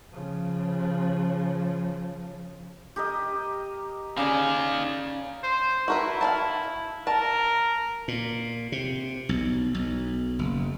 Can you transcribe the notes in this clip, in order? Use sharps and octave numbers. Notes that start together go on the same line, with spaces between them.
C#3 F3
G4 A#4 D#5
C#3 D#4 D5 F5 G#5
C5
E4 F#4 A#4 B4
F5 G#5 A5
A#4 A5
A#2
C3
B1
B1
F#1